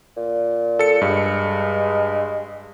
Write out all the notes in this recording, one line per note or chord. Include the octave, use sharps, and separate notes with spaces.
A#2
A4 C#7
G2 G#3